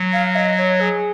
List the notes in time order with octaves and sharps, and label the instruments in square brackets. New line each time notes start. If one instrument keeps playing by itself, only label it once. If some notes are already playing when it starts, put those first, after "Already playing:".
Already playing: [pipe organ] F#3
[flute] F5
D#5
C#5
G#4